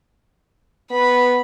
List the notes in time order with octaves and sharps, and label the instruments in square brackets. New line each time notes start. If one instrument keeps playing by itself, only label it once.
[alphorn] B3 [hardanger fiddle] B5